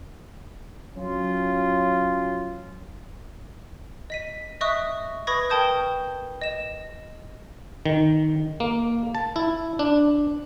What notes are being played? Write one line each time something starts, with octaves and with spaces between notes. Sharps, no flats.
F#3 C#4 F4
D#5 B6 D#7
D#5 E5 C#6 D#6 F#6
B4 B5 C#6 D#6 G#6 A#6
A#4 G5 A5 D#6 G6
D#5 E7
D#3
A#3
A5
E4
D4